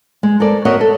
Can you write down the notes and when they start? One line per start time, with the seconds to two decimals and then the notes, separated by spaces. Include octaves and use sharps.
0.23 G#3
0.40 A4 A#4 C5 D5
0.65 F#4 A#4 C#5 D#5 E5 F#5
0.81 A4